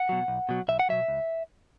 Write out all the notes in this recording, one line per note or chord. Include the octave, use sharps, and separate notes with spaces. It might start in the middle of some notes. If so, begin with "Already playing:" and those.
Already playing: F#5
B2 F#3
B1
B2 F#3
B1 E5
F#5
B2 F#3 E5
C#2